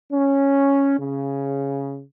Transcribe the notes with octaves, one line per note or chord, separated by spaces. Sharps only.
C#4
C#3